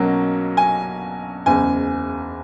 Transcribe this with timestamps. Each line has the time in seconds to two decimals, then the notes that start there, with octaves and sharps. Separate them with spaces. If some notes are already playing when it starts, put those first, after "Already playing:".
Already playing: B1 B2 F#3 A#3 C#4
0.57 G#5
1.46 F#1 E2 C#3 G#5